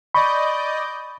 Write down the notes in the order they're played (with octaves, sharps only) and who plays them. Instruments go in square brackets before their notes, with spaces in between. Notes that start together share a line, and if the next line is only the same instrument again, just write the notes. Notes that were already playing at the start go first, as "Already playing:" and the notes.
[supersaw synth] D5 D#5 G6 [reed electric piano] B5 C#6